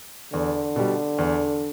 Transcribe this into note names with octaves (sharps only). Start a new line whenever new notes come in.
E2 D3
B2 G3
E2